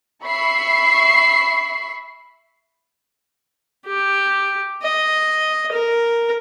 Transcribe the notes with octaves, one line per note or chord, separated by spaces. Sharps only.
E5 B5 C#6 C7
G4
D#5
A#4